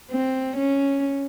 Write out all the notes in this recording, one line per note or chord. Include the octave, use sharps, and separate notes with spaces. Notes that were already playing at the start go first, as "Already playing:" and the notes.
C4
C#4